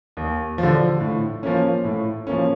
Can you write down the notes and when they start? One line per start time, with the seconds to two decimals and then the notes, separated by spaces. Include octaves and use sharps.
0.17 D#2
0.58 F3
0.63 D3
1.00 A2
1.43 F3 A#3 C#4
1.85 A2
2.27 F3 A#3 C#4